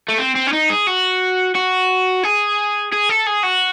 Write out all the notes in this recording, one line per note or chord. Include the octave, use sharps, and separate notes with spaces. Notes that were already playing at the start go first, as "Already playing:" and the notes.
A3
C4
C4
C#4
D#4
G#4
F#4
F#4
G#4
G#4
A4
G#4
F#4